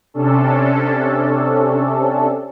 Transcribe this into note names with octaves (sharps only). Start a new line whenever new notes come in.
C3 C#4 D4 A4